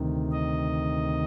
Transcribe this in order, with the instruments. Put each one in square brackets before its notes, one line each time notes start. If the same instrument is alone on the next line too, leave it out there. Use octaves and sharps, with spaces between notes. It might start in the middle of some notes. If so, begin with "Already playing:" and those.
Already playing: [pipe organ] D2 C3 D#3
D#5